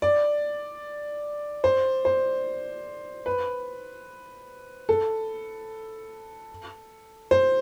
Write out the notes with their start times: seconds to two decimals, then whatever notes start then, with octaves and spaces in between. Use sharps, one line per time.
0.02 D5
1.64 C5
2.05 C5
3.26 B4
4.89 A4
7.31 C5